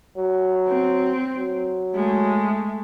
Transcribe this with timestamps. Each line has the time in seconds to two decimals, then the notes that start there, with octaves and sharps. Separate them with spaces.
0.17 F#3
0.68 C4
1.37 F#3
1.95 G#3 A3